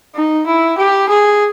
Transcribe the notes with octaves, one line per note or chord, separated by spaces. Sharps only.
D#4
E4
G4
G#4